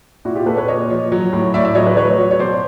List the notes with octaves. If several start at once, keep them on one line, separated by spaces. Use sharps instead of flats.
A#2 E4 F#4
F4 G4
A#2 A4 B4
B4 C#5
A#2 C#5 D#5
F3
F#3
A2
A2 D5 E5
D5 E5
F#3 C#5 D#5
B4 C#5
F#3 B4 C#5
F#3
C#5
B2 C5 D5